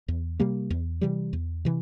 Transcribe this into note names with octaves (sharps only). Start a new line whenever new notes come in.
E2
C3 G3 A#3
E2
C3 E3 G3
E2
C3 E3